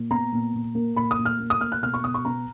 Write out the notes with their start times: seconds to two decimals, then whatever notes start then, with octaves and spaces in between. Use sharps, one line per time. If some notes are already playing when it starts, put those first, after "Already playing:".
Already playing: A#2
0.11 B3 A#5
0.32 A#2
0.54 A#2
0.75 A#3
0.96 A#2 B5
1.11 D#6
1.18 A#2
1.25 F6
1.40 A#3
1.50 D#6
1.61 A#3 F6
1.72 F#6
1.83 B2 F6
1.94 C#6
2.04 B2 D#6
2.14 C#6
2.25 B3 A#5